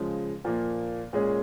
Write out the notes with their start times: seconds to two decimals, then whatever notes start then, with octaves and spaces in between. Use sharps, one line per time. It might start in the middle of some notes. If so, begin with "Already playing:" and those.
Already playing: C#3 F3 G#3
0.45 A#2 F3 A#3
1.13 A#2 G#3 C#4 G#4